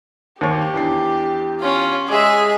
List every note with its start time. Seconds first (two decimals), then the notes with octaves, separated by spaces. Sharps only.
0.41 D#2 G4 C5 C#5
0.74 E2 D4 C7
1.60 C#4 F4
2.08 G#3 G#4 E5 D6